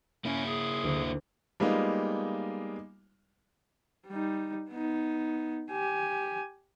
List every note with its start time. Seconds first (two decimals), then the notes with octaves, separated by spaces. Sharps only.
0.25 A#3 C#4 E4
0.46 G#4
0.84 D2
1.60 G3 G#3 A#3 B3 D#4 F4
4.07 G3 D#4
4.71 B3 D#4
5.71 G4 G#5